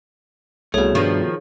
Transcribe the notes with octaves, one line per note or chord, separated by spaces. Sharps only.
C2 B2 A3 G#4 C#5
G2 D#3 F3